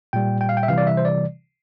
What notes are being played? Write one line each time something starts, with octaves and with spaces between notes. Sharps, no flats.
A#2 G3 G5
G5
F5
G5
E5
C3 E3 G3 F5
D5
E5
C5
D5